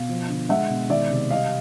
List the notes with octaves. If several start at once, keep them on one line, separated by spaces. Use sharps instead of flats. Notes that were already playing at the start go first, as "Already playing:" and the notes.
Already playing: B2 F5
F3
D3
G#3 E5 F#5
B2
D#3 D5 E5
C3
G3 D#5 F5